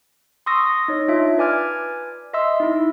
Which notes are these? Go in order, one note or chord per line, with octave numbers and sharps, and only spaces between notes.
C6 C#6 D#6 E6 A#6
D#4 C#5
D4 F4 E5
B4 D5 G#5 D6 F6 G#6
D#5 E5 C6 E6
D#4 E4